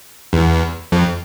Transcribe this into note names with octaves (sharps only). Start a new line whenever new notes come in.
E2
F2